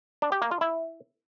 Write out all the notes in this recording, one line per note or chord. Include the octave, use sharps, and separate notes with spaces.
D4
G4
A#3
F4
E4